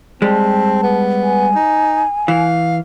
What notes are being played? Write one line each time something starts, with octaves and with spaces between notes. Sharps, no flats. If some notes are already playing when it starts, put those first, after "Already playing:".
G3 G#3 C4 A5
B3
G#5
D#4
E3 F5